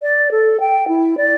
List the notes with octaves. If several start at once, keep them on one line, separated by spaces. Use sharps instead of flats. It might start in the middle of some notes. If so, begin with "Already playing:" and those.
D5
A4
G5
E4
D5